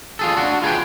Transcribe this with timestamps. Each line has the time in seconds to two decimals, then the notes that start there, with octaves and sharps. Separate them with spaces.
0.19 F4 G#4 A4
0.37 D4 F#4
0.62 F4 G#4 B4 G5